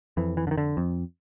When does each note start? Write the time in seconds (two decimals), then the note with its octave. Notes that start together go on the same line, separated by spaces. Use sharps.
0.17 F2 E3
0.37 E3
0.47 D3
0.51 D#3
0.58 D3
0.77 F2